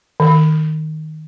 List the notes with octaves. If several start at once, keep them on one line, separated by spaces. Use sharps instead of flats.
D#3